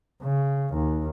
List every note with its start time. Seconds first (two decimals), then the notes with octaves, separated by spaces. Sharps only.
0.22 C#3
0.74 D#2